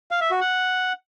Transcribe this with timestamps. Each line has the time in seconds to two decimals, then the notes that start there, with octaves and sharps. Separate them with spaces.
0.11 F5
0.21 E5
0.31 F#4
0.41 F#5